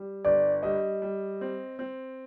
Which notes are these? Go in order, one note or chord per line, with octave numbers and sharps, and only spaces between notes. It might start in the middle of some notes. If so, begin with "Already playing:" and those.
Already playing: G3
G1 D5
G3 D#5
G3
C4
C4